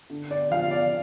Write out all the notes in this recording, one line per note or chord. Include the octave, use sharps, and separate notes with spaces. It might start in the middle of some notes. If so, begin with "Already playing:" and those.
D3
D5
F3 F5
D5